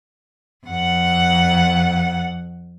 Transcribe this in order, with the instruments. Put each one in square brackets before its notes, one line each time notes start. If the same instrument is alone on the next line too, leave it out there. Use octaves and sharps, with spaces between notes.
[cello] F2 F#5